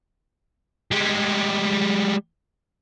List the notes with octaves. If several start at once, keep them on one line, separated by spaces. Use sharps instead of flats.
G3 G#3